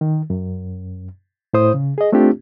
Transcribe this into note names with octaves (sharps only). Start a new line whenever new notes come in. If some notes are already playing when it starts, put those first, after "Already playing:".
D#3
F#2
A2 E4 C5 D#6
C#3
G#4 D#5
A3 C4 D4 F4 G4